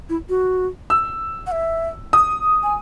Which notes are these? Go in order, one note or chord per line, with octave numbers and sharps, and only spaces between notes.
E4
F#4
E6
F#5
E5
D#6
G#5